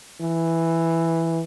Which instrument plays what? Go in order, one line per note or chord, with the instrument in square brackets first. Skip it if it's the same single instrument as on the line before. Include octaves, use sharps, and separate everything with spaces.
[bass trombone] E3